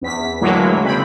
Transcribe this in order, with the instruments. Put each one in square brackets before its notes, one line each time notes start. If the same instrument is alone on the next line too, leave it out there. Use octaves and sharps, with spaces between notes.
[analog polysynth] E2 B6
A2 D3 E3 F#3 G#3 A#3
C#3 C4 B5